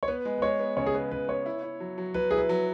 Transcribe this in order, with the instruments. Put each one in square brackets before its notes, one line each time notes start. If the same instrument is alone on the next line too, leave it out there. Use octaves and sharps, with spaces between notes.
[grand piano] C#5
[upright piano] B3 [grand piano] B4
[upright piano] G#3
[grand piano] B4
[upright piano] G#3 [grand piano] C#5
[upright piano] B3
[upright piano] C#3 [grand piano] C#5
[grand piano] G#4
[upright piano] B3 [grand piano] B4
[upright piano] C#3 [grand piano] B4
[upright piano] B3 [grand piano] C#5
[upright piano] E4
E4
F#3
F#3
[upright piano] F#3 [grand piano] B4
[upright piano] E4 [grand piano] G#4
[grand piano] B4
[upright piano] F#3